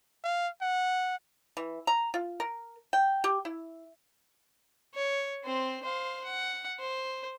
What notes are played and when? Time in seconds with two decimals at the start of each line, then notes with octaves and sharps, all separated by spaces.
0.24 F5
0.61 F#5
1.57 E3
1.87 A#5
2.14 F4
2.40 A#4
2.93 G5
3.24 G4
3.45 E4
4.95 C#5
5.44 C4 C5
5.83 C5 F5
6.24 F#5
6.79 C5